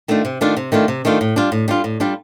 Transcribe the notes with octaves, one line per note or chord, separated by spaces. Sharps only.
D#3 A3 D4 F4
C3
D#3 A3 D4 F4
C3
D#3 A3 D4 F4
C3
D#3 A3 D4 F4
A2
G3 D4 F4
A2
G3 D4 F4
A2
G3 D4 F4